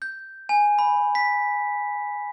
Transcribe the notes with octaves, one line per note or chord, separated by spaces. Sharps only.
G6
G#5
B5
B6